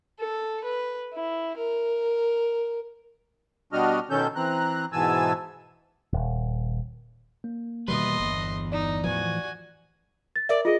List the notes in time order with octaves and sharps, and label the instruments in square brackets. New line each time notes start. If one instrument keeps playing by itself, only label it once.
[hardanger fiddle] A4
B4
E4
A#4
[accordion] B2 G3 D4 F#4 D#5 F6
B2 D#3 C#4 A4 G6
E3 C4 A#5 F#6
G#2 B2 E3 G#5 A5 E6
[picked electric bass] D#1
[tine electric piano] A#3
[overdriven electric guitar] E2 B4 [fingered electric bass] B2 D#3 G3 [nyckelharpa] D#5 C6
[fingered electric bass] G1
[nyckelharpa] D#4 [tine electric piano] D5
[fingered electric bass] A2 E3 F3 [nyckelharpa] F#4 G#5
[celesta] A6
[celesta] A#4 E5 [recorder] D5
[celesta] F4 G#4 [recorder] D#5